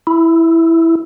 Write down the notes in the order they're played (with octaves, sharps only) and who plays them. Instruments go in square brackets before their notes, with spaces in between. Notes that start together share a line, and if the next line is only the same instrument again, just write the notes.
[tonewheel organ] E4